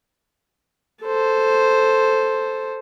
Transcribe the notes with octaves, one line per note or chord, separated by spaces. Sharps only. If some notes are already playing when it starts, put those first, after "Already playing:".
A4 C5